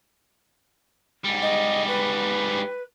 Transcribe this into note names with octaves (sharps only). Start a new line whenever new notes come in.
G#2 G3
D#5
B4